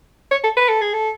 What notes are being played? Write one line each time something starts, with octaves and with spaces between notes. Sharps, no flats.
C#5
A4
B4
A4
G#4
A4